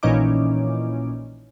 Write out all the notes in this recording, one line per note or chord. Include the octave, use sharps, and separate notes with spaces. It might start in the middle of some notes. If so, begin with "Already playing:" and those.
A#1 A#2 E3 C#4 D#4 D6